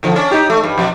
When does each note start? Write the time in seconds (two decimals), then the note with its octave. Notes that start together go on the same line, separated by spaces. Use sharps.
0.03 D#2 D3 F3
0.16 C#4 D4
0.32 D#4 G4
0.50 A3
0.64 G2
0.78 F2 B2 D5